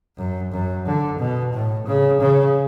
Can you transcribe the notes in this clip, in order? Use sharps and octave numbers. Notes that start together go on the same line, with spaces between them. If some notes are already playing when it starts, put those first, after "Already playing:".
F#2
F#2
D3
B2
A2
C#3
C#3